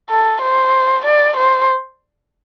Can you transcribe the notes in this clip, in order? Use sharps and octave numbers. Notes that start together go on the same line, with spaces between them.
A4
C5
D5
C5